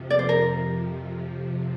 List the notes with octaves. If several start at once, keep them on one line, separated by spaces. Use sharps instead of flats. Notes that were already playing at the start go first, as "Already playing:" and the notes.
Already playing: F2 C3 F3
D5
C5
A#4